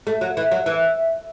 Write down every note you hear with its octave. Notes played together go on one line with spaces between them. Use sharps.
A3
F#3
E3
F#3
E3